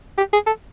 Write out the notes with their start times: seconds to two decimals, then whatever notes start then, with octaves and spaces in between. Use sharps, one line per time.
0.18 G4
0.33 G#4
0.47 A4